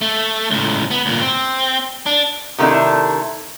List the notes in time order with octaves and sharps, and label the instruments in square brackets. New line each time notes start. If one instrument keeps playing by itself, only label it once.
[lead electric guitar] A3
C#2 A2
B3
D2 A#2
C4
D4
[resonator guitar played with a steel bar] C3 D#3 A3 D4 E4